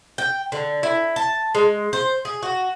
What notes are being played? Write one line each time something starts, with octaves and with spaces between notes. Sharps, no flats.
G5
D3
E4
A5
G#3
C5
G#4
F#4